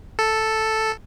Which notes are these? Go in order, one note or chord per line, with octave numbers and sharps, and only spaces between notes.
A4